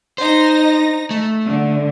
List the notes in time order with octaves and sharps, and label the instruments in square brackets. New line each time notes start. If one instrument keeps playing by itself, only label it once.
[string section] D#4 A#6 [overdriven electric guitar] C5
[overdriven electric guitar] A3
[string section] D3